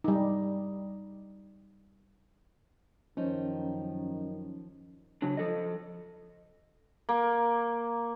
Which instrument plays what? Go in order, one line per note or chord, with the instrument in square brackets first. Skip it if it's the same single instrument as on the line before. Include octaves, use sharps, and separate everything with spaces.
[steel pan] G3 D#4
[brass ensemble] F#2 D#3 [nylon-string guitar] F3 D#4 [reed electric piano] C#4
[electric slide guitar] C#3 F#3 D4
F3 A4 D#5
[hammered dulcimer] A#3